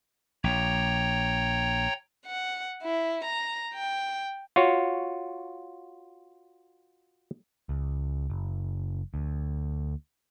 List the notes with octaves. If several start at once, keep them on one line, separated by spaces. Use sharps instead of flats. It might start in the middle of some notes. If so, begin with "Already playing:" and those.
A#1 C#5 G5 A#5
F#5
E4
A#5
G5
F4 F#4 C#5
C#2
F#1
D2